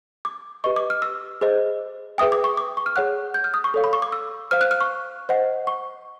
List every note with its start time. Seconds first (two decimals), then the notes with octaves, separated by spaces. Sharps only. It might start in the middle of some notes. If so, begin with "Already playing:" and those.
0.25 D6
0.64 G4 B4 D#5 C#6
0.76 D6
0.90 F6
1.02 E6
1.41 G#4 C5 D#5
2.18 G#4 B4 E5 G5 D#6
2.32 D6
2.44 C#6
2.57 D6
2.77 C#6
2.86 F6
2.96 G#4 C#5 F#5 F#6
3.34 G6
3.44 F6
3.54 D#6
3.64 C#6
3.74 A4 C#5 F5
3.84 B5
3.93 C#6
4.02 D6
4.12 E6
4.51 C5 F5 F6
4.61 F#6
4.71 F6
4.81 C#6
5.29 C5 D#5 F#5
5.67 C#6